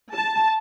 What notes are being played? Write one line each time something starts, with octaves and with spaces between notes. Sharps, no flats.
A5